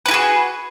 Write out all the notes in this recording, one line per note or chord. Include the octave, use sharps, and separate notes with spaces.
E4 F#4 G#4 B4